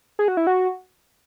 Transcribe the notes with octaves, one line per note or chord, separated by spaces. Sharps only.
G#4
F#4
E4
F#4